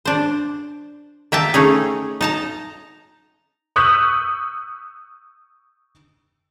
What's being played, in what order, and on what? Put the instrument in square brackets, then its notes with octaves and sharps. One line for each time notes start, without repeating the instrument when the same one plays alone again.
[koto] D4 C5
A#3 E5 G5 A5
A3 C#4 D#4 G#4
D#4 A5 A#5
[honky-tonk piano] C#6 D#6 E6 F#6 G6 B6